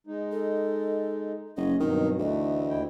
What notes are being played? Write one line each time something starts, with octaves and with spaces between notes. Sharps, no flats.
G#3 D#4
A4
F#1 C#4 D#5
G2 B2 D#3 F#3 C4
D2 E3 A3 D#5
D#2 E4 G5